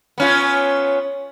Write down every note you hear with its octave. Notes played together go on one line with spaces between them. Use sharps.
B3 C#4 F4